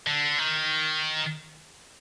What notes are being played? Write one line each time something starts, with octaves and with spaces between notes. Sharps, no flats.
D3
D#3